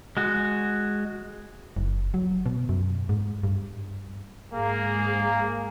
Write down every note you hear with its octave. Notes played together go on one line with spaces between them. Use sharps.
G#3 F#4
F#1
F#3
B2
F#2
G#2
G2
G#2 A#3 G#4